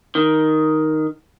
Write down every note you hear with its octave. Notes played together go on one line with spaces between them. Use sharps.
D#3